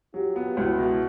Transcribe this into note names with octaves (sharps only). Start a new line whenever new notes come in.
F#3 F4 G4
B3
C#2 E4 F#4
B2